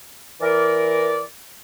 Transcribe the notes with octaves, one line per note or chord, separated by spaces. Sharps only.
E3 A#4 D5